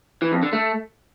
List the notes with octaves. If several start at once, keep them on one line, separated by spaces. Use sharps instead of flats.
E3
F2
D3
A3